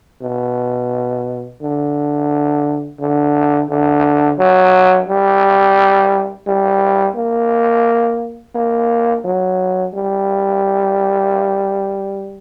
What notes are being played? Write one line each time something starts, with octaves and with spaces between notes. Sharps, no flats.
B2
D3
D3
D3
F#3
G3
G3
A#3
A#3
F#3
G3